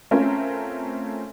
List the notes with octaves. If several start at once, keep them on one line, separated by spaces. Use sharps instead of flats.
A3 C4 C#4 F4 A#4